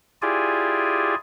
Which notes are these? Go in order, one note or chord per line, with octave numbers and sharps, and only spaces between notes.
E4 F4 G4 G#4 D5 G#5